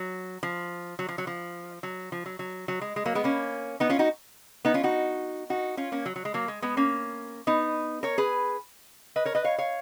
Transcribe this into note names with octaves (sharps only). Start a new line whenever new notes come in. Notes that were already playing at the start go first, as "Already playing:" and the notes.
Already playing: F#3
F3
F#3
F3
F#3
F3
F#3
F3
F#3
F#3
F#3
G#3
G#3
F#3 A#3
G#3 B3
A#3 C#4
B3 D#4
C#4 F4
D#4 F#4
B3 D#4
C#4 F4
D#4 F#4
D#4 F#4
C#4 F4
A#3 C#4
F#3
F#3
G#3
F#3 A#3
G#3
G#3 B3
A#3 C#4
B3 D#4
A#4 C#5
G#4 B4
B4 D#5
A#4 C#5
B4 D#5
C#5 F5
C#5 F5